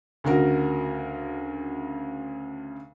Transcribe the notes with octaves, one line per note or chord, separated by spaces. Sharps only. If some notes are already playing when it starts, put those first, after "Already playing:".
D2 C#3 F#4 A#4